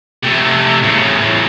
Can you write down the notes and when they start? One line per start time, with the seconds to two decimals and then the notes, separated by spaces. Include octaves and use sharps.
0.23 C3 A3
0.83 A2 C#3